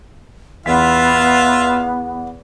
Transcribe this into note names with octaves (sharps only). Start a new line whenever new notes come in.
E2 B3 F4 E5 F5 B6